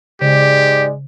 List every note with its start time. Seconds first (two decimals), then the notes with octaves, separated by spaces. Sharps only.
0.21 G#2 C#3 G#3 G4 D5